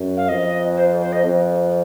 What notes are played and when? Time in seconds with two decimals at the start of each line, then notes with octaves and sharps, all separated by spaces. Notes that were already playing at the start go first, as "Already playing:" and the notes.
Already playing: F#2
0.17 F5
0.29 F2 D#5
0.77 C5
1.01 C5
1.12 D#5
1.25 F2